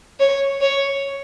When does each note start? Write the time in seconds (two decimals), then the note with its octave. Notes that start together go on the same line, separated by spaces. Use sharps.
0.20 C#5
0.61 C#5